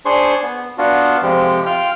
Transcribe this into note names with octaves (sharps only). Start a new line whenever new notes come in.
D4 G#4 C5 C6 C#6
B3
B3 D4 F4 F#4
F2 C3 F3 G#3 G4
F4 G5 F6